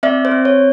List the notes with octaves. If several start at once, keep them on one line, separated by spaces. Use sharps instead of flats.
C4 D5 E5
C5
C4
C#5